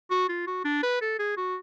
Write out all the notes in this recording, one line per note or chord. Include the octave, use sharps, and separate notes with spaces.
F#4
F4
F#4
D4
B4
A4
G#4
F#4